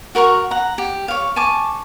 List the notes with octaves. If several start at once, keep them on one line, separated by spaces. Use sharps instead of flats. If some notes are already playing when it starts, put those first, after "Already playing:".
F#4 A#4 A#5 C#6
F#5 A#5
G4
C#5 F5
G#5 A5 C#6 D6